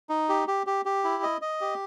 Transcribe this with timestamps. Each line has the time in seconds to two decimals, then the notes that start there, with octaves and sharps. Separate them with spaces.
0.09 D#4
0.29 G4
0.48 G4
0.67 G4
0.85 G4
1.04 E4
1.23 D#5
1.42 D#5
1.61 G4